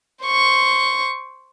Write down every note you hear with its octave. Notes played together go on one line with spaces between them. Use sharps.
C5 C#6